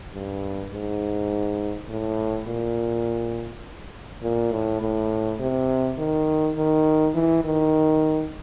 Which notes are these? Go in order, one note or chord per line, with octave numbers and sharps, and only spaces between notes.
G2
G#2
A2
A#2
A#2
A2
A2
C3
D#3
D#3
E3
D#3